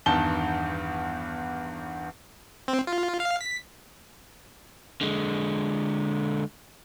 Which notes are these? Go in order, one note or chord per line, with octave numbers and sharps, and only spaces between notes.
E2 G2 D#3 A5 G7
C4
F4
F5
B6
D3 G#3